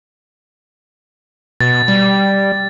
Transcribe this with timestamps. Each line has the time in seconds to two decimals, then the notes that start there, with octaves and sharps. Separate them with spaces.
1.60 B2 A6
1.88 G3